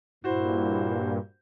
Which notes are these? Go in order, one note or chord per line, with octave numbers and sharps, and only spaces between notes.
G2 A#2 E4 F#4 C5